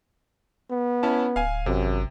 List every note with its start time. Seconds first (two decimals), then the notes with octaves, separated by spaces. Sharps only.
0.71 B3
1.03 C#4 E4 A5
1.36 D1 F5 G#5
1.66 G#1 F#2 C3